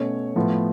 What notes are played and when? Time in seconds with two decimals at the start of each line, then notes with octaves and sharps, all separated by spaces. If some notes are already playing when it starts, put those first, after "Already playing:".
Already playing: B2 A3 C#4 C#5
0.36 A2 F3 B3